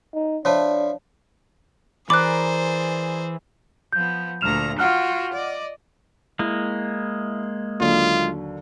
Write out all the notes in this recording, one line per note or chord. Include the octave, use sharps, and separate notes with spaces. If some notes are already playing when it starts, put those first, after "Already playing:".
D#4
F3 D4 E4 C#5 A5
E3 G#4 A#4 C5 D5 B5 D6 F#6
F3 B3 G6
D2 A#2 A#5 F6 E7 F7
F4 F#4 F#5 G5 F6 F#6
D5 D#5
G#3 A#3 E4
D#2 D3 F#3 F4